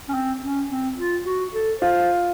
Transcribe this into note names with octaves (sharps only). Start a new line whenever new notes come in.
C#4
C4
C#4
C4
F4
F#4
A4
F4 C5